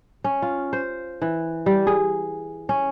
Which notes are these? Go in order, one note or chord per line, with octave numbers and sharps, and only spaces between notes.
C#4
F4
C5
E3
G3
G#4
C#4